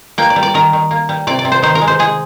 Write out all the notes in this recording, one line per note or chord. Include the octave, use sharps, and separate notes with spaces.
A#3 G5
D5
G3
D5
D#3 A#4
D#3
A#3
G3
C3 D5
D5
C3
C5
D#3 C5
A#4
G#3
C5
G#3 G#4